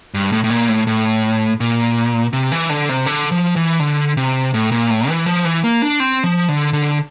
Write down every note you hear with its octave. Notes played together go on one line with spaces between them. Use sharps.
G2
A2
A2
A#2
A2
A2
A#2
C3
E3
D3
C3
D3
F3
E3
D3
C3
A2
A#2
A2
E3
F3
E3
A#3
D4
C4
F3
D3
D3